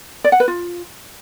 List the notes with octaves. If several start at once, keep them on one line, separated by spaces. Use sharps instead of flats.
D5
F#5
B4
F4